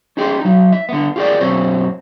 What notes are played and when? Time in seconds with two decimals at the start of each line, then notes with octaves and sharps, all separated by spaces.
0.17 C#4 D#4 G#4 G5 C6
0.40 F#3 D#4
0.72 E5
0.89 D3 B3
1.16 F4 G4 G#4 A#4 D5
1.40 F#2 B2 C4 C#5